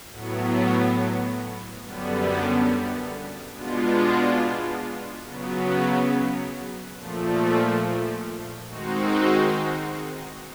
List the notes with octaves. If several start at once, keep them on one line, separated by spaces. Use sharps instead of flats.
A2 F#3 B3
F#2 D3 G3 B3
B2 G#3 B3 D4 F4
C#3 F#3 B3
A#2 F3 A3
D#3 G#3 C4 D#4 F#4